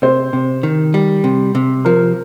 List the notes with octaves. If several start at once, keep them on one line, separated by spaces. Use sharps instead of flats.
C3 C5
C3
D#3
G3
C3
C3
F3 A#4